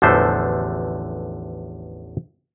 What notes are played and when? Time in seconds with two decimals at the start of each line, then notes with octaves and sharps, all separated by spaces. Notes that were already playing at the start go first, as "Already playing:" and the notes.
0.02 A1 E2 D3 F3 A3 C5